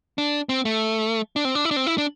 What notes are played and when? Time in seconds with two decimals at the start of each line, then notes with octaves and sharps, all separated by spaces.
0.18 D4
0.49 C4
0.65 A3
1.36 D4
1.45 C4
1.55 D4
1.65 E4
1.71 D4
1.77 C4
1.87 E4
1.98 D4